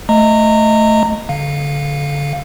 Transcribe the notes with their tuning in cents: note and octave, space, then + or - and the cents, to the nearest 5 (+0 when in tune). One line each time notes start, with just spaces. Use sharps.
A3 +0 D#5 +0 A#5 -25
D3 -25 F5 +0